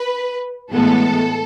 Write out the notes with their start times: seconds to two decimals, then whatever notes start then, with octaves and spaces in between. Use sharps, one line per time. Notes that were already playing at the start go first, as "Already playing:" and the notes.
Already playing: B4
0.72 A2 E3 G#3 B3 A4